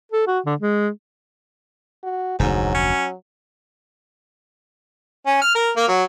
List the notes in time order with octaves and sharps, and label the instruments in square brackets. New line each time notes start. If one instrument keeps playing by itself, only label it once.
[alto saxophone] A4
F#4
D3
G#3
[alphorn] F#4
[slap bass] F1 D2 [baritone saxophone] G#2 [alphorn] F#3
[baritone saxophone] C#4
[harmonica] C#4
F6
A#4
A#3
F#3